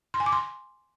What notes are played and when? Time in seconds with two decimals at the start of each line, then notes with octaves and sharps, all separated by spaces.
0.14 C6
0.20 G#5
0.26 D6
0.32 C6